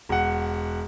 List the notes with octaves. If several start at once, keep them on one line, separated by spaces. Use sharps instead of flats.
E1 F#5